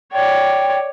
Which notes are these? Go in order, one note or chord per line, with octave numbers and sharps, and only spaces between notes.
C#5 D5 G5